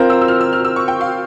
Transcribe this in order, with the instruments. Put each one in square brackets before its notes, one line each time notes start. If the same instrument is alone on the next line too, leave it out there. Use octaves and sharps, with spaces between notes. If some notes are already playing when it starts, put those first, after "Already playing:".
Already playing: [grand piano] C4 F4 A#4 [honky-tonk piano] A#5
[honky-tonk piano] E6
E6
F6
E6
F6
E6
C#6
G5
F5